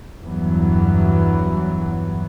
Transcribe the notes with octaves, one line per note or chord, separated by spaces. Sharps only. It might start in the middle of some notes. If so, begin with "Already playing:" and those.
E2 G2 E3 F#3 B3